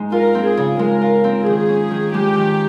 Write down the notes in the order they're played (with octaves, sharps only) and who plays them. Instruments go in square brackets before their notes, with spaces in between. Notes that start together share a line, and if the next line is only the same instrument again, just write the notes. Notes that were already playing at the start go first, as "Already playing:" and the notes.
Already playing: [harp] G#2 G#3 D#4
[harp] F4 [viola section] A#4
[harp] C4
[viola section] G#4
[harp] C#3
[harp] G#3 [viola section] A#4
[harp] F4
C4
[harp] D#3 [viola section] G#4
[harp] C#4
D#3
[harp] G#3 [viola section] G4
[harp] D#3